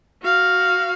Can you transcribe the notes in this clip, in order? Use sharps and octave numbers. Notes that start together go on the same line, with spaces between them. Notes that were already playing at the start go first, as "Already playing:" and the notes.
F#4 F5